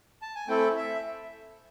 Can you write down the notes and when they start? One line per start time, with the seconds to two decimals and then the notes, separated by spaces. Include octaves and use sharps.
0.22 A5
0.35 G#5
0.48 A3 C4 E4 A4 G5
0.77 E5